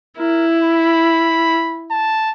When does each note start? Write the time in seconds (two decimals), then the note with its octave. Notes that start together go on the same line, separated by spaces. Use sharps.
0.18 E4 A#4
0.62 B5
1.91 A5